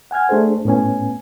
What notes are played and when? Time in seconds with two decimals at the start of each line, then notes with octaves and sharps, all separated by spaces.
0.11 F#5 G#5 F6 G#6
0.29 A3 D4 G#4 A4 C5
0.65 A2 B3 C#4 G#5